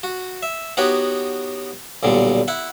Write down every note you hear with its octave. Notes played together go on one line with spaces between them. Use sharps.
F#4
E5
B3 D#4 F#4 G4 B4 C#5
B1 A#2 D3 G3
E4 F#5